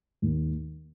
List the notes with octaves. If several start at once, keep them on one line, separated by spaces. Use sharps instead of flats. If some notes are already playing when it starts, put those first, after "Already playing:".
D#2